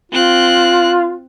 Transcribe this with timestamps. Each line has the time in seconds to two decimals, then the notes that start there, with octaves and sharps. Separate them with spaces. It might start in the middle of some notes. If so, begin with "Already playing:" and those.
0.12 C4 F4 F#6